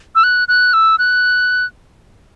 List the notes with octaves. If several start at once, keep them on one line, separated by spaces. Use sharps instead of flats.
E6
F#6
F#6
E6
F#6